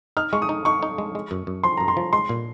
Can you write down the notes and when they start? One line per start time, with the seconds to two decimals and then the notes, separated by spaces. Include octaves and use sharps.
0.17 D#4 F6
0.33 G#3 C#6
0.42 D#6
0.49 D#4
0.65 D#4 C#6
0.83 D#4
0.98 G#3
1.15 G#3
1.31 F#2
1.47 F#2
1.64 F3 C6
1.77 F#2 A#5
1.88 C6
1.97 F3
2.13 G#3 C6
2.29 A#2